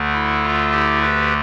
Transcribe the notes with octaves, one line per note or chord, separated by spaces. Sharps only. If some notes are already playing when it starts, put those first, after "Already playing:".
Already playing: D2 D3 A3
E4
F4
E4 G4
G4 B4